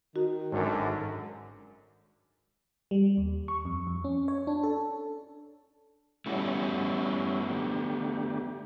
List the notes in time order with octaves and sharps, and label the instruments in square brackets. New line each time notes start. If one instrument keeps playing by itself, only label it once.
[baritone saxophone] D#3 [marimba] F#4
[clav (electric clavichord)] G#1 [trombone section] F#2 D3
[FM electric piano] G3
D#2
C#6
F2
F2
C#4
C#5
D4
A4
[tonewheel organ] G3 C#4 E4 [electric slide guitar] A3 B3 F#4
[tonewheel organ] D3 G4